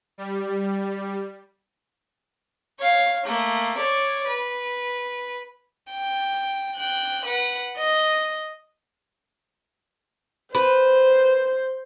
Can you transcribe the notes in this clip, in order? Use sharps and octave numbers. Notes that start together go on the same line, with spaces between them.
G3
C#5 F5
A3 A#3
C#5 D5
B4
G5
G5 F#6
B4 F#5
D#5
B4 C5